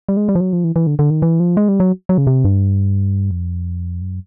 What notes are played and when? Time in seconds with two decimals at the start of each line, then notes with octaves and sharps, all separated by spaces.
0.09 G3
0.17 G#3
0.29 G3
0.35 F3
0.41 F#3
0.53 F3
0.64 E3
0.76 E3
0.87 D3
0.99 D3
1.10 D#3
1.22 E3
1.40 F3
1.57 G#3
1.69 G3
1.80 F#3
2.09 F#3
2.18 C#3
2.27 C3
2.45 G2
3.31 F2
4.01 F#2